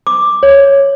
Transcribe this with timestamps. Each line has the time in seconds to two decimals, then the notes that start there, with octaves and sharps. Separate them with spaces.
0.07 D6
0.43 C#5